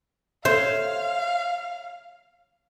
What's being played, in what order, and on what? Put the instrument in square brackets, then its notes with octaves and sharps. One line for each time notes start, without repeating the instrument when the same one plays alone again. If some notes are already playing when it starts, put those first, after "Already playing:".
[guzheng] C5 [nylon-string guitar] C#5 E5 [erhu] F5